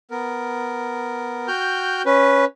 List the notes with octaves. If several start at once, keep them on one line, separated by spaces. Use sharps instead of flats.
B3 A#4
F#4 G5 F6 G6
C#4 B4